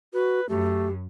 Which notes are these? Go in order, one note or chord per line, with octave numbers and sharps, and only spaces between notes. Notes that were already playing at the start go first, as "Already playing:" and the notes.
F#4 B4
F#2 A3 G4